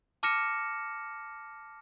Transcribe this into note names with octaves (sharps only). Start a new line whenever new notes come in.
A5 D6 F6 A#6 C#7 E7